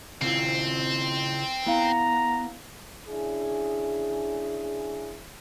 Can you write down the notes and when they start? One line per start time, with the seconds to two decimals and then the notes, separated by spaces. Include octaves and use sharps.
0.22 C#3 C4 E4 F4
1.67 B3 E4 F5 A#5
3.09 C#3 D4 E4 G#4